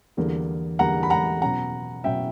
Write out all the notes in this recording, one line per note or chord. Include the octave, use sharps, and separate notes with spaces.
E2 D3 G3 A#3
E2 D3 G3 A#3 F#5 A#5
B5
F#5 A#5
B2 F#3 C#4 F#5 A#5
B2 F#3 C#4 E5 G5